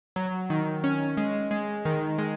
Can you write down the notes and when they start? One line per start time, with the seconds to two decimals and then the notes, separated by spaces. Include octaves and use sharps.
0.16 F#3
0.50 D#3
0.84 C#4
1.17 G#3
1.51 G#3
1.85 D#3
2.18 G#3